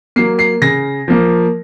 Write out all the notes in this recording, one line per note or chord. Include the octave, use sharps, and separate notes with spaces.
F#3 A#3 C7
C7
C#3 A#6
F3 A#3